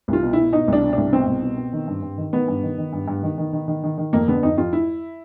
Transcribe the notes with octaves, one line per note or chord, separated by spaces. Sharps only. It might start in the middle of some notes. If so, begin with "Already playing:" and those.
C2 F4
B2
B2 E4
B2 D#4
C2 D4
B2
C2 D4
B2 C4
C2
B2
B2
D#3
G2
G2
D#3
D#3 B3
G2
D#3
D#3
G2
G2
D#3
D#3
D#3
D#3
D#3
D#3
F2 A#3
D3 B3
F2 D#4
F2 F4
E4